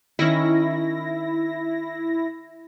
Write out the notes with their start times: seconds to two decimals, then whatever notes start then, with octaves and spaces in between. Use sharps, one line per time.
0.19 D#3 C#4 E4 A#6